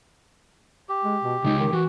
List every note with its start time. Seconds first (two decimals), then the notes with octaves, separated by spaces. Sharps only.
0.89 G4
1.03 G#3
1.23 B2
1.44 C#3 G#3 D#4
1.60 D#3
1.73 E3 F#4